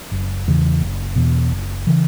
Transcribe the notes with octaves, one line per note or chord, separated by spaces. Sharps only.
F#1
E2 C#3 E3
F#1
E2 B2
F#1
C#3 E3